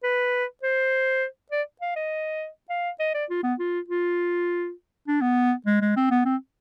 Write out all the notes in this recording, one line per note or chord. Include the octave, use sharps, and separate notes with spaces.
B4
C5
D5
F5
D#5
F5
D#5
D5
F4
B3
F4
F4
D4
B3
G#3
G#3
C4
B3
C4